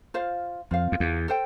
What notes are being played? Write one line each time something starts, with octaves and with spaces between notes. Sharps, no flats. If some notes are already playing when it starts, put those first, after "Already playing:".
F4 C5 F5
F2 F4 C5 F5
F2
E2
A4 C5 G5